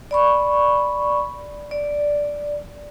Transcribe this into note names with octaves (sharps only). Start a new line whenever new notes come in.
D5 B5 C#6
D5